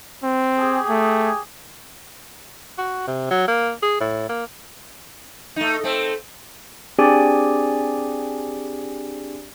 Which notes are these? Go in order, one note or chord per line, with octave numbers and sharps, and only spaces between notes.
C4
G4 G#4
A3
F#4
C3
F#3
A#3
G#4
A2
A#3
A3 D#4
A3 C4
C4 D4 G4 G#4 D5 G#5